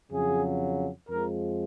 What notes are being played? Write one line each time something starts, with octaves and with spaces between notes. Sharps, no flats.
F2 C#3 F#3 G#4
F2 F3 G#3 A#4